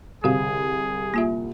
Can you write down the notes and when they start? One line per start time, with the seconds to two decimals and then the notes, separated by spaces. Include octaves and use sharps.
0.24 C2 D3 G#4 F5
1.14 A#3 F4 E5